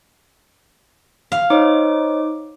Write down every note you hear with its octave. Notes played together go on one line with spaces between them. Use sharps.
F5
D#4 C5 C#5 D#5 D6